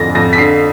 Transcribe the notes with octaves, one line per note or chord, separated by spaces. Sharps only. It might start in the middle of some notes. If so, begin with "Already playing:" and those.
Already playing: F2 D3 A6 A#6
F2 A#6
B6
D3 C7